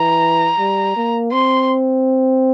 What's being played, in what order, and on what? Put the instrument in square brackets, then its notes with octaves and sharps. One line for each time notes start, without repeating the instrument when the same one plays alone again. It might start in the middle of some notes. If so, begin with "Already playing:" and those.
Already playing: [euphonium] E3 [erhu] A#5
[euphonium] G3
A#3
[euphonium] C4 [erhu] C6